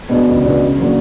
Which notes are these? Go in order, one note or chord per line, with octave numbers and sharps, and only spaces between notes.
B2 G#3 B3 D4
C#2
B2 G#3 B3 D4
C#3
F#3 A#3 D4